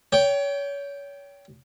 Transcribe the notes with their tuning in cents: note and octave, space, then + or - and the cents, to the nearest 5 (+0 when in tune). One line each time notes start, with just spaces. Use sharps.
C#5 +30 G5 +0